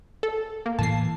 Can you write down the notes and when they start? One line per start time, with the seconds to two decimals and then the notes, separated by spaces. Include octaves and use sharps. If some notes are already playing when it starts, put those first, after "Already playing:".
0.23 A4
0.66 A#3
0.79 A2 E3 A5 C7